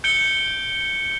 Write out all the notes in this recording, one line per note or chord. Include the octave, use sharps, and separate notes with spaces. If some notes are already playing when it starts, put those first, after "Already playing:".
G6 C#7 D7 G7